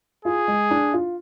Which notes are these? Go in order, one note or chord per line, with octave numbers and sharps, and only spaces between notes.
F4 G#4
G#3
D4
F4